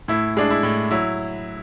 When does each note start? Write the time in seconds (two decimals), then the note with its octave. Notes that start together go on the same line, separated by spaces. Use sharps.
0.08 A2 E4
0.37 G#3 D4
0.50 E4
0.63 A2
0.91 F#3 E4